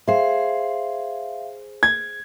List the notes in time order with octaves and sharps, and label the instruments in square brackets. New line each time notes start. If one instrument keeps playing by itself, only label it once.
[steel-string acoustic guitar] G#4 C5 [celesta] E5 F5
[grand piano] G#6